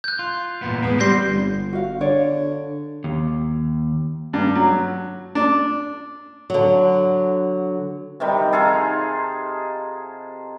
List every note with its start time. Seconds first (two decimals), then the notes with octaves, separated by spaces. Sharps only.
0.04 F#6 G6
0.19 F4
0.62 E2 A#2 B3
0.82 A2 G#3 B3
1.00 G3 C4 C5 C6 G6 A#6 C7
1.29 G1
1.73 F#4 F5
2.01 D3 G#4 C#5 D5
3.04 D#2
4.33 G2
4.55 F#3
5.35 D4
6.50 D3 F#3
8.20 C3 D#3 G3
8.53 D#4 F4 G#4 A4